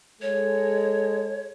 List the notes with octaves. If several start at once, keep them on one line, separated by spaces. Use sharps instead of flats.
G#3 A4 C#5